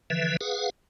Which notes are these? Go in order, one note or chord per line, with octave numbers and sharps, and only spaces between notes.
D3 E3 F3 B4 E5
G#4 B4 F5 F#5